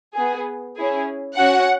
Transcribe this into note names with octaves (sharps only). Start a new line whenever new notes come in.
B3 G#4
C#4 E4 G#4
C#4 F#4 F#5